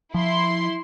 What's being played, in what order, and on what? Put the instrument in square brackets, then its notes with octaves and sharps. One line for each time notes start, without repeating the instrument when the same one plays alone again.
[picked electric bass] F3 [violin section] E4 C6